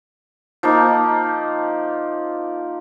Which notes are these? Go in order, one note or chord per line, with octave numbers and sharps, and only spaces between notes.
F3 A#3 D#4